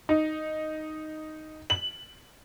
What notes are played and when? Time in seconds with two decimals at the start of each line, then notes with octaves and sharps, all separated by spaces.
0.09 D#4
1.70 F#7